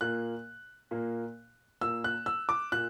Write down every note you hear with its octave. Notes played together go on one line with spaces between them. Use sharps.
A#2 A#3 F#6
A#2 A#3
A#2 A#3 E6
F#6
E6
D6
A#2 F#6